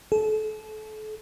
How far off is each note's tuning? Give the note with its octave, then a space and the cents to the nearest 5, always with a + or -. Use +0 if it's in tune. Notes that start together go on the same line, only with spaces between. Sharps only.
A4 -35